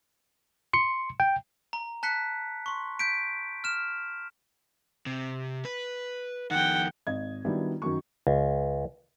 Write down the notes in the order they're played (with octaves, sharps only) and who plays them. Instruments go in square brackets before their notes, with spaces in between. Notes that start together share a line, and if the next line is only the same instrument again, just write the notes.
[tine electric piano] C6 C#7
G5
[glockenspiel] A#5
A5 F#6 B6 C#7
C6 C#6
G6 B6 D7
F6 E7
[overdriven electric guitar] C3
B4
[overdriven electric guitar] F2 D#3 [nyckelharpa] F#5 G5
[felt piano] G#1 D#5 G#6
D#3 F#3 G3 B3 D4 E4
F#2 D#3 F#3 C#6
[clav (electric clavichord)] C#2